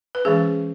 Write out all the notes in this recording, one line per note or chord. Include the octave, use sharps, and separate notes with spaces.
B4
E3 G#3 C#4 G#4